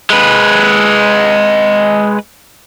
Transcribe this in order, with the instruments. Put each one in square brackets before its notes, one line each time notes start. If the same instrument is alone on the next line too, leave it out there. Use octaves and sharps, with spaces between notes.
[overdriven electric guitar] G#3 B4